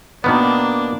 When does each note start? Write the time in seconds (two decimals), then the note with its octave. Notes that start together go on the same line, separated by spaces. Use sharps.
0.24 B2 D#3 A#3 B3 D4